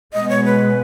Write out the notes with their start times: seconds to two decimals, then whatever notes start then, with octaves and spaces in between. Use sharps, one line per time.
0.13 B2 G#3 B3 D#5
0.29 C#5
0.45 B4